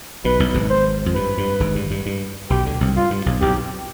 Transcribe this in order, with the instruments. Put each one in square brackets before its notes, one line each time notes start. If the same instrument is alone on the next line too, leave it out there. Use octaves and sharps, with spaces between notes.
[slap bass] B1 B2 [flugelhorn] B4
[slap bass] B1 B2
G#1 G#2
[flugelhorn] C5
[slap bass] F2
[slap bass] G2 [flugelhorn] B4
[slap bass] G2
G#1 G#2
G2
G2
G2
[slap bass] B1 B2 [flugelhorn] G4
[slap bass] D2 D3
C2 C3
[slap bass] G2 [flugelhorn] F4
[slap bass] G2
B1 B2
[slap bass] B1 B2 [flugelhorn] G4